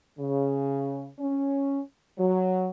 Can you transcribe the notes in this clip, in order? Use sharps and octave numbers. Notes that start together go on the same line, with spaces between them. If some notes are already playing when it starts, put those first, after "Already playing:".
C#3
C#4
F#3